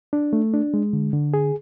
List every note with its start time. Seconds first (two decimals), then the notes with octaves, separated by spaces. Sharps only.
0.13 D4
0.33 A3
0.54 D4
0.74 G#3
0.93 D3
1.13 D3
1.34 G#4